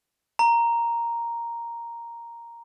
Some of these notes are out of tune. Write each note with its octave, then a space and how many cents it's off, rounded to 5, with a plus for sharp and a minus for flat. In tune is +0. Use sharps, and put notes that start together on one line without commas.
A#5 +0